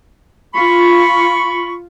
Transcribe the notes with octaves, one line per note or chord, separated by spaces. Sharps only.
F4 B5 C#6